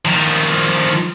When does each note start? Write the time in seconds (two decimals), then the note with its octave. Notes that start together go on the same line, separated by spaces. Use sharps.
0.05 D#3 F3